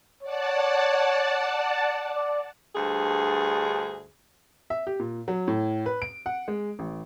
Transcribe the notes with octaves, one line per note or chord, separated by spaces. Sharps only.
C#5 D5 F#5 A5
D5
D2 G2 G#4
E5
G4
A#2
F#3
A2
B4
D7
F#5
G#3
A1